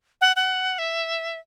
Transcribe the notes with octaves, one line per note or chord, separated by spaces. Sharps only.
F#5
F#5
E5